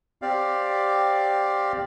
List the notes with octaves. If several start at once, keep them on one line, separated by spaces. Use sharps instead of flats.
C4 G4 D5 F5